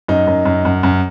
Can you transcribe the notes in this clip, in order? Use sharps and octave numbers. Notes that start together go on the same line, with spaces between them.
F#2 D#4
F#2
F#2
F#2
F#2